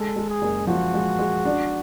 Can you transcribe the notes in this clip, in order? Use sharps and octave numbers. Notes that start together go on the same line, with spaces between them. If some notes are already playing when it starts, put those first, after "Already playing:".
Already playing: G#3 A4
G#3
G#4
F#1
F3 F#4
G#3
G#3
D4